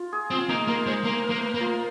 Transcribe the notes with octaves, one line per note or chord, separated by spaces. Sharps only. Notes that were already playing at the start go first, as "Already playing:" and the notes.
Already playing: F4
G#4
C4 F4
A#3 D#4
A#3 A#4
G#3 C5
A#3 A#4
A#4
A#3
A#4
A#3
F4